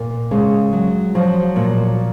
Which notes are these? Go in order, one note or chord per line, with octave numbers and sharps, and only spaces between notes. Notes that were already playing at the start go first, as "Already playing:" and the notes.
Already playing: A#2
C#3 G#3
F#3
F3 F#3
A#2